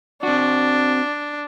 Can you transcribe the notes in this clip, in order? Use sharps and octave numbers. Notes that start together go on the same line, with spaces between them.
C4 D4 F#4